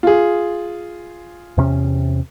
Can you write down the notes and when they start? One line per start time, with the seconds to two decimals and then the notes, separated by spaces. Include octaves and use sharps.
0.03 F4 G#4
1.57 E2 C3 C#4